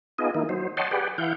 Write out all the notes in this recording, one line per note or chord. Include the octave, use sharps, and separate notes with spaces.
B3 D#4 F4 G#4 D#5
D#3 A#3 D#4 E4
F#3 C5
C#5 D#5 F#5 G5 A5 C6
G4 G#4 B4 D5 F#5 G5
E3 E4 F5 F#5 G6